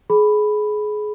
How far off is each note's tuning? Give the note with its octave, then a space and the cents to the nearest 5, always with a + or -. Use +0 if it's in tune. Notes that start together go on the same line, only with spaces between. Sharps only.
G#4 +25 B5 +0